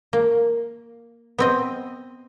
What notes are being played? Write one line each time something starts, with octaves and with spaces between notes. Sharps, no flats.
A#3
B3 C4 D#5